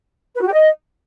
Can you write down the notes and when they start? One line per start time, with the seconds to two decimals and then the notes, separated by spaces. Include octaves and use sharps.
0.35 B4
0.41 F#4
0.47 G4
0.53 D#5